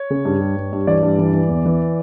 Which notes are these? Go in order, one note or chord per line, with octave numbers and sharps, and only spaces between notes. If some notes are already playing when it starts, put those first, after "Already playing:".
Already playing: C#5
C#3
G2
G3
G2
G2
E3 D5
G2
E3
E3
E2
E3